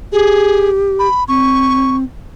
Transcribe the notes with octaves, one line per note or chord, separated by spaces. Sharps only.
G4 G#4
B5
C4 C#6